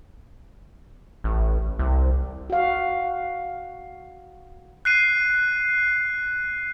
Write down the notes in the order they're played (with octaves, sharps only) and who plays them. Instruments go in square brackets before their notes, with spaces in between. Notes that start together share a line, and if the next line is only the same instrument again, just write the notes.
[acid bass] A1
C2
[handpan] F#4 F5
[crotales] F#6 C7 D#7